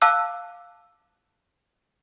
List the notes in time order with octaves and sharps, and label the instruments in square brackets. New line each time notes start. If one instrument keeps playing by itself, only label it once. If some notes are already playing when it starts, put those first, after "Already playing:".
[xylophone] F5 A5 D6 E6 F#6